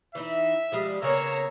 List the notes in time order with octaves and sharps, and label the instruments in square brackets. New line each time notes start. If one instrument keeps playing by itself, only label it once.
[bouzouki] E3 D#4 E4 [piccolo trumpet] E5
[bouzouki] F3 G3 G#3
[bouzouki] C#3 A#3 B3 [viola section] C#5 A#5 [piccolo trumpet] E6